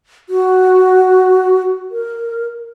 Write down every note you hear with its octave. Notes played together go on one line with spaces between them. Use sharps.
F#4
A#4